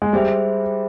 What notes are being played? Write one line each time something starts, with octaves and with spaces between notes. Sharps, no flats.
G#3
G3 G#4 C5 E5